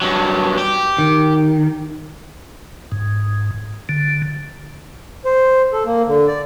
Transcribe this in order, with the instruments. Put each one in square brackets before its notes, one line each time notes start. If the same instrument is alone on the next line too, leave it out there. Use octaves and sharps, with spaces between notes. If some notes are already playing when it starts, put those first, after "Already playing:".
[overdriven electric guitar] G2 F#3
G4
[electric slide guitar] D#3
[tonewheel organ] G#2
D3
[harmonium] C5
A4
A#3
D3
D5